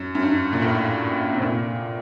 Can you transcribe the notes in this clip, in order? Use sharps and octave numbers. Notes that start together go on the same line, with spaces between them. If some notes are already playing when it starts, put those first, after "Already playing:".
Already playing: F#2
F#2
G2
A#2
A2
C3
A#2